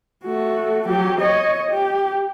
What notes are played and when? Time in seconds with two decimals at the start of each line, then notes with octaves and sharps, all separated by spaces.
0.24 A3 F#4
0.88 F#3 G4
1.20 C#5 D#5
1.70 G4